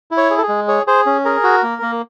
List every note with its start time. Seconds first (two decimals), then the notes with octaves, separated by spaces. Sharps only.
0.11 E4
0.17 C#5
0.31 G#4
0.38 A4
0.43 G#4
0.49 G#3
0.68 G#4 C#5
0.87 G#4 C5
1.06 C#4
1.25 G#4 A#4
1.44 F#4
1.63 A#3
1.82 A#3